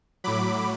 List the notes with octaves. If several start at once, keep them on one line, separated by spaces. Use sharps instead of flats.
A2 F#3 B5 D6